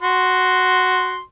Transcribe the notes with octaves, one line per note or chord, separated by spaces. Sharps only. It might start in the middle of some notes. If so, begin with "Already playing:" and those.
F#4 C6